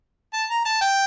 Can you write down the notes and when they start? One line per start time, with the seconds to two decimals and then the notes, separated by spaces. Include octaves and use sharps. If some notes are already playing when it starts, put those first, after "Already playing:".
0.33 A5
0.50 A#5
0.65 A5
0.82 G5